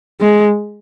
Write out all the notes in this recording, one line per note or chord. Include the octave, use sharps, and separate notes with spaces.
G#3